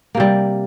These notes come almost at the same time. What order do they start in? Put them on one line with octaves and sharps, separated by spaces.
A#3 C3 G3